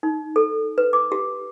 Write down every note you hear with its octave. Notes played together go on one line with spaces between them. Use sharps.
D#4
A4
B4
D6
G4